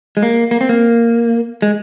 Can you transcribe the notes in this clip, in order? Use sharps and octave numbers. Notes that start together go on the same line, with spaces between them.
G#3
A#3
A#3
C4
A#3
G#3